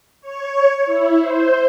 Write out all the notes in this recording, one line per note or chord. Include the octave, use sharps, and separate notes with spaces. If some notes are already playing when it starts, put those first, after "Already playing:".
C#5
E4
C5